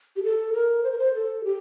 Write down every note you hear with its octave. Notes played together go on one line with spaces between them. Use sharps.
G4
A4
A#4
C5
A#4
C5
A4
G4